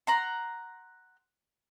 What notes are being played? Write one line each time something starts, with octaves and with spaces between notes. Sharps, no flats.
F#5 A#5 C6